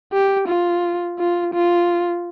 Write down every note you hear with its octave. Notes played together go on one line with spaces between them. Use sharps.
G4
F4
F4
F4